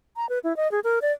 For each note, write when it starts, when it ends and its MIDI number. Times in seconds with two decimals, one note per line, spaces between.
0.16 0.28 82
0.29 0.39 71
0.44 0.55 64
0.57 0.70 75
0.72 0.80 68
0.84 0.99 70
1.02 1.12 74